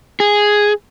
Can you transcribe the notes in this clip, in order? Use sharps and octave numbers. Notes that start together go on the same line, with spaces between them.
G#4